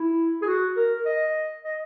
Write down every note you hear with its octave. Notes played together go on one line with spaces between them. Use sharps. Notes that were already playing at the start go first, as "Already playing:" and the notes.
Already playing: E4
G#4
F#4
A#4
D#5
D#5